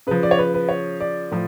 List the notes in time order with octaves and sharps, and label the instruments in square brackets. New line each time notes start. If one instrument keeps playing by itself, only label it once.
[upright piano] C#3 F3 B4
D5
C#5
B4
B4
C#5
D5
A2 F3